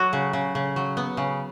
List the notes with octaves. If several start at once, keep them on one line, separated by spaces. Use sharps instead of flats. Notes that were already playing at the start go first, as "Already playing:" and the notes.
Already playing: F#3 F#4
C#3
C#3
C#3
F#3
B3
C#3